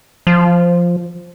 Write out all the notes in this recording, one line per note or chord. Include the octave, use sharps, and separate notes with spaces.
F3